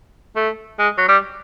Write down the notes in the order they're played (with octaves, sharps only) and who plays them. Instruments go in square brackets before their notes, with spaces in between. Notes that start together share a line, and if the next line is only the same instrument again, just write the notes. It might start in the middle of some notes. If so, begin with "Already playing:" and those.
[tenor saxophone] A3
G#3
F#3
G3